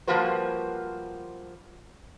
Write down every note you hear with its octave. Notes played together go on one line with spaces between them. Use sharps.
F3 G3 A#3 F#4 B4 C5